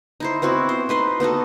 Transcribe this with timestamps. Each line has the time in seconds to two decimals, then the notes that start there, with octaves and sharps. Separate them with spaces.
0.20 D#4 E4 C5
0.42 B3 C4 E4 F#4
0.69 C5
0.89 D#4 B4 C6
1.20 B3 D#4 F#4 A4